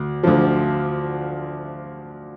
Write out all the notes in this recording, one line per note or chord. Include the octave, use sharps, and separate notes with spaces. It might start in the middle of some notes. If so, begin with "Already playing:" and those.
Already playing: D2
D2 D3 F3